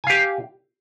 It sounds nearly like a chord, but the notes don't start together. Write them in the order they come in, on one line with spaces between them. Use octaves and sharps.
G#5 F5 G4